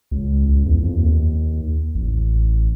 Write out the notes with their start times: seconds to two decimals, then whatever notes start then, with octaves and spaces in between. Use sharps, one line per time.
0.11 C#2
0.49 C#2
0.66 E2
0.83 F2
0.97 D#2
1.95 A1